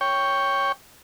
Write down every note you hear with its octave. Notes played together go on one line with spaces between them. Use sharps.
C#5 G5